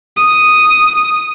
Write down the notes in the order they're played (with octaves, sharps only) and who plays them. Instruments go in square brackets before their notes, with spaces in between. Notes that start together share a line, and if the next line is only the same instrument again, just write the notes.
[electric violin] D#6